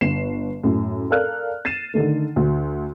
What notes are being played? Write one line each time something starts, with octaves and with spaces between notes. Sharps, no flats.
G1 C7 E7
F#2 A2
A4 A#4 D5 F5 F6 F#6
A6 C7 D#7 E7
D3 D#3 A3
D2